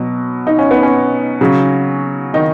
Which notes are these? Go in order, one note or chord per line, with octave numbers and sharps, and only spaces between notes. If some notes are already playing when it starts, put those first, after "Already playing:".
Already playing: B2 F#3
D#4
C#4
B3
C#4
C#3 F#3
D#3 D#4